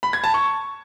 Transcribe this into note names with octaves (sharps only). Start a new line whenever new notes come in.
B5
G#6
A5
C#6